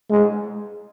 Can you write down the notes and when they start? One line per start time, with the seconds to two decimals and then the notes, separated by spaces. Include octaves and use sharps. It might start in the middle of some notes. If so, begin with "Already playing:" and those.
0.10 G#3